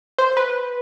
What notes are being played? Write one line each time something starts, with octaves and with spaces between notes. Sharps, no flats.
C5
B4